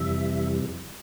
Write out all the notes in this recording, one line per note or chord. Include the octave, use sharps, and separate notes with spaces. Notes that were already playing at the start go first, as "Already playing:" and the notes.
Already playing: F2 C3 E3 G3 E5